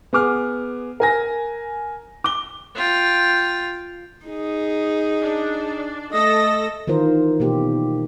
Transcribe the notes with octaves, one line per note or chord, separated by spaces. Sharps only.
B3 G#4 D6 F6
A#4 G#5 A#6
D6 G7
F4 G5
D#4 G#4
D4
A3 A4 D#5 E6 A#6
D#3 E3 F4 A#4 C5
B2 A#3 G4